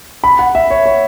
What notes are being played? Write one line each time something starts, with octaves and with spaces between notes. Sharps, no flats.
B5
F#5
E5
C#5
C#5